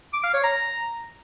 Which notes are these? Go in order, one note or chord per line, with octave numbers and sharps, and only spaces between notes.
D6
F5
C#5
A#5